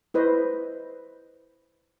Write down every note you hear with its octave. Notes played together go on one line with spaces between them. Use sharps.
E4 B4 C5 D#5